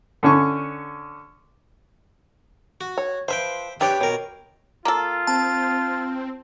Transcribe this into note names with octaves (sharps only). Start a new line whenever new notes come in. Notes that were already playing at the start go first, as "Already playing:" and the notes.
D3 C#4 C#6
F#4
C#5
F3 B4 C5 E5 G5
D4 G4 B4 C#5 G5
B2 A#4 C#5
A#3 F4 A4
C4 A5